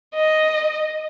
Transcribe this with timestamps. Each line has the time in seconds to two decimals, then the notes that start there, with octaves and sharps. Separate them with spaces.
0.14 D#5